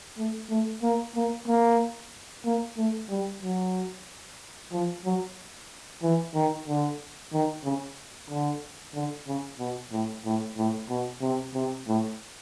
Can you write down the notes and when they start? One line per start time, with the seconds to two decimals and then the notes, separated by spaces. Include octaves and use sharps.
0.18 A3
0.50 A3
0.83 A#3
1.15 A#3
1.48 A#3
2.45 A#3
2.77 A3
3.10 G3
3.42 F#3
4.72 F3
5.05 F#3
6.03 E3
6.35 D#3
6.68 D3
7.33 D#3
7.64 C#3
8.30 D3
8.94 D3
9.27 C#3
9.59 B2
9.92 A2
10.25 A2
10.57 A2
10.90 B2
11.22 C3
11.54 C3
11.87 A2